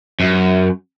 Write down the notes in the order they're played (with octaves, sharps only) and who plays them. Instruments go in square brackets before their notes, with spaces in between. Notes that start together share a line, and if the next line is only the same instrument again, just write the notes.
[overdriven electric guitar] F#2